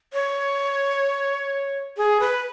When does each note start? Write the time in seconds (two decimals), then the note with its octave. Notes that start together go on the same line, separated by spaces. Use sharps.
0.13 C#5
1.97 G#4
2.20 B4